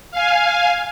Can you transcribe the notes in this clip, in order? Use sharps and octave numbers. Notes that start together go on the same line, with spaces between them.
F5 G#5